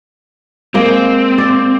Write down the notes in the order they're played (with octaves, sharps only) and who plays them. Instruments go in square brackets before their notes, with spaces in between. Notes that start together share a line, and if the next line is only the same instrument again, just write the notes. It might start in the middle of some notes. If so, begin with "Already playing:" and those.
[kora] G#3 A#3 [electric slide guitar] C4
[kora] D5